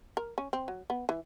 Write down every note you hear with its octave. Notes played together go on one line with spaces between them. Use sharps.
A#4
C#4
C4
F#3
B3
E3